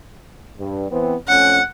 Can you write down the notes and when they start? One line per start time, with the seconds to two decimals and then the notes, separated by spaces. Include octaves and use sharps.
0.59 G2
0.91 E3 B3 C4
1.28 F2 A3 C#4 F#5